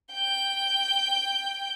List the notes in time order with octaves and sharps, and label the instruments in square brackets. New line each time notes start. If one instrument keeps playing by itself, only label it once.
[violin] G5 G6